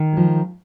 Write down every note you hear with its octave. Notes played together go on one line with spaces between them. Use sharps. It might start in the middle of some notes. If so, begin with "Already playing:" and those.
Already playing: D#3 D#4
F3 G#3